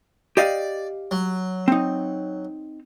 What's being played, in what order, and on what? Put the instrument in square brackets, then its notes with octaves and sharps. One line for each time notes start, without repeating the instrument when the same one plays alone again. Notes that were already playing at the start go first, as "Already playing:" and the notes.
[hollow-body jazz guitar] G4 D#5 F5 [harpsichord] D5
[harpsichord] F#3
[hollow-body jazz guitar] C4 D#4